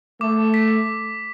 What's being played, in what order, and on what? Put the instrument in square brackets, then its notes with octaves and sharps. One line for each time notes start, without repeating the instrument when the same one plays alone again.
[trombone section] A3 [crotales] D6
[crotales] B6